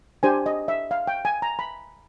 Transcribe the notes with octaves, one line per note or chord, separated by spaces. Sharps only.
D4 G4 C5 G#5
D#5
E5
F5
G5
G#5
A#5
B5